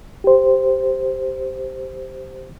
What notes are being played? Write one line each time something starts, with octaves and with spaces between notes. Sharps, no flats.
G4 C5